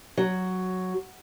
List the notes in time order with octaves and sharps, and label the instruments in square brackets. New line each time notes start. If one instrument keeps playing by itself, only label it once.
[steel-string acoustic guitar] F#3